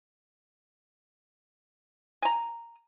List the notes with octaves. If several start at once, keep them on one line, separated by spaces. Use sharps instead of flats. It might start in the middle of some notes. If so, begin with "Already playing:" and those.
G#5 A#5